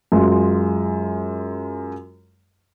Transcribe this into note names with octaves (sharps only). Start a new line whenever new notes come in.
F#2 G#3 F4